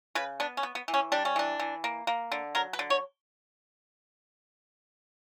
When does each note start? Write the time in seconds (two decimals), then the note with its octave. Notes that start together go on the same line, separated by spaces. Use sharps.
0.15 C#3 B4
0.40 B3 D4
0.57 C#4
0.63 B3
0.75 B3
0.88 E3
0.94 C#4
1.12 G3 D4
1.25 C#4
1.36 E3 D4
1.60 E3
1.84 A#3
2.07 A#3
2.32 D3
2.55 F#3 A#4
2.73 B4
2.79 D3
2.90 C#5